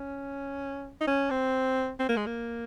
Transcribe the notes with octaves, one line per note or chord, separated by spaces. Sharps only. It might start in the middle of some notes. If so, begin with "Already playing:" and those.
Already playing: C#4
D#4
C#4
C4
C4
A#3
G#3
A#3